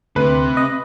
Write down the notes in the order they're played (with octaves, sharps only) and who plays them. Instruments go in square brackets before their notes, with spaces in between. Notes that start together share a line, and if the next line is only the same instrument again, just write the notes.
[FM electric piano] D2 [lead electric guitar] C3 [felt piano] B4
[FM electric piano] D#5